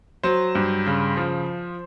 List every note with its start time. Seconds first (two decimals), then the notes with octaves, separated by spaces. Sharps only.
0.23 F#3 C5
0.55 G2
0.87 C#3
1.17 F3